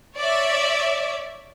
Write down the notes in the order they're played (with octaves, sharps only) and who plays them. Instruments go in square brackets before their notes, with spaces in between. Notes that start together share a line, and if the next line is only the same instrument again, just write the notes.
[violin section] C#5 D5 E5